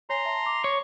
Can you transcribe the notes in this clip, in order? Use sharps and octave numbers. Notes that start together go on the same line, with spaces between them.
C#5 G#5 A#5 C6
E5 A5
D6
C#5